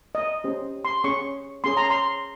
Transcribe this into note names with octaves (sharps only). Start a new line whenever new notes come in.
D#5
C#4 G4 C5
C6
C#4 G#4 C#5 C#6
C#4 G#4 C#5 C6
A#5
C6